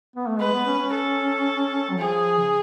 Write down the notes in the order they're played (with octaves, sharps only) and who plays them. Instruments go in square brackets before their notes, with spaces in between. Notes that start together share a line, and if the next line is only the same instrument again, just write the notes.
[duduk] B3
A3
[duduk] G#3 [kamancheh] B4
[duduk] B3
C#4
C#4
[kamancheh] A4
[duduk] F#3
[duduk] F3 [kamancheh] G#4
[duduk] C#3